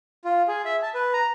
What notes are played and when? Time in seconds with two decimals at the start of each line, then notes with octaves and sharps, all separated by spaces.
0.25 F4
0.48 G#4
0.65 E5
0.82 A5
0.94 B4
1.13 A#5